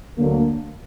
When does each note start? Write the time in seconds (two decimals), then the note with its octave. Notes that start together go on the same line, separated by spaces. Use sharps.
0.17 D2 D3 F#3 A#3